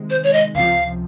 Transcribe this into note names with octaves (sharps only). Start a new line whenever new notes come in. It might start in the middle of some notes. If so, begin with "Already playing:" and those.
Already playing: C3 D#3 G#3
C5
C#5
D#5
C#2 C3 F3 F5